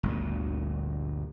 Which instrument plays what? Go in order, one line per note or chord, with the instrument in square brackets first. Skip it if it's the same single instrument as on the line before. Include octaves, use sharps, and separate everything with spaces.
[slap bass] G1 D2 A#2